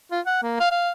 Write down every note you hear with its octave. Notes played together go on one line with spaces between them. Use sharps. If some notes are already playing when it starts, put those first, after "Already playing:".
F4
F#5
A#3
F5
F5